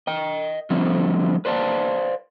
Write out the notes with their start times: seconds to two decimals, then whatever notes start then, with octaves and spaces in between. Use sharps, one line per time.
0.07 D#5 G5
0.70 D3 F3 G3 A3 C4
1.45 B4 C5 D5 F5 A5